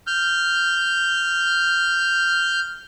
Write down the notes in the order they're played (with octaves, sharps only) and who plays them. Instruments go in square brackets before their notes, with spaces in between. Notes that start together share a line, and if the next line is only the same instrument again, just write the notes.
[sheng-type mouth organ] F6 G6